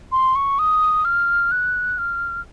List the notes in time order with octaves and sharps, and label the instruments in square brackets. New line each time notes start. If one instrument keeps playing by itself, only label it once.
[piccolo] C6
C#6
D#6
F6
F#6
F6